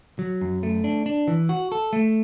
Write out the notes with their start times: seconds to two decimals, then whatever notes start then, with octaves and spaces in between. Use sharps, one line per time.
0.19 F#3
0.41 F#2
0.63 A3
0.84 D4
1.06 D4
1.28 E3
1.49 F#4
1.72 A4
1.93 A3